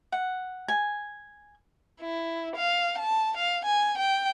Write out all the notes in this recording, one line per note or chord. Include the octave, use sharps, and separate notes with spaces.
F#5
G#5
E4
F5
A5
F5
G#5
G5